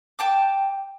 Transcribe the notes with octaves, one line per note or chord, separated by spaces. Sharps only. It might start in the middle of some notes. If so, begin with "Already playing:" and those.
G5 A5 D6